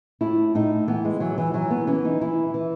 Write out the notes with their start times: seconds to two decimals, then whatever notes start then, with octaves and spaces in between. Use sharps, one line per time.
0.21 A2 E4
0.55 A2 D#4
0.88 E3 B3
1.05 G#3
1.20 E3 F#3
1.38 E3
1.54 E3 F#3
1.71 B3
1.87 E3 C#4
2.05 D#4
2.21 E3 E4
2.54 E3